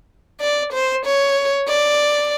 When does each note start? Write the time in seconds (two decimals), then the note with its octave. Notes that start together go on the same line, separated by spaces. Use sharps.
0.40 D5
0.73 C5
1.05 C#5
1.68 D5